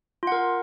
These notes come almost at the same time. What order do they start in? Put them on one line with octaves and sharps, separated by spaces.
F4 F#5 A#4